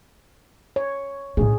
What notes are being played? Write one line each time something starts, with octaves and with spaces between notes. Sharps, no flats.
C#5
A2 C#4 G#4